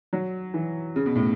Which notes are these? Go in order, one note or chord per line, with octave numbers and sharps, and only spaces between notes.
F#3
E3
C#3
B2
A2